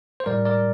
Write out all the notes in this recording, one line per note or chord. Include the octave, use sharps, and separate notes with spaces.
C5
A2 G3 A#4 D5
A#4 D5